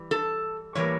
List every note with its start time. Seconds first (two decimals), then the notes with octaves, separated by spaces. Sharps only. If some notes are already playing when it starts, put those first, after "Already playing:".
Already playing: E3 G3
0.11 A4
0.75 A2 E3 G3 A#3 C#5